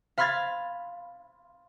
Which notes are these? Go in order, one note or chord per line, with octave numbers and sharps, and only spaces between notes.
F5 B5 C6 F6 G#6 A6